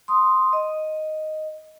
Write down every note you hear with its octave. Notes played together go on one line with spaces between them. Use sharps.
C6 D#6
D#5